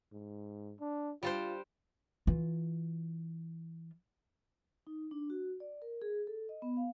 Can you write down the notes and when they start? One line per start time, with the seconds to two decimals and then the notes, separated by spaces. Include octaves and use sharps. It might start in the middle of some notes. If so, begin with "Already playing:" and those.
0.12 G#2
0.80 D4
1.23 G3 D4 F4 C5
2.27 E3 F4
4.87 D#4
5.11 D4
5.30 F#4
5.60 D5
5.82 A#4
6.02 G#4
6.27 A4
6.49 D#5
6.62 B3
6.77 F5